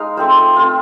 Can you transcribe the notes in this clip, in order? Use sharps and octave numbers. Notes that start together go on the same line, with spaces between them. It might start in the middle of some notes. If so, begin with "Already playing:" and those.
Already playing: G#3 D#4 F5
A3 C4 F4 C5
A3 C4 F4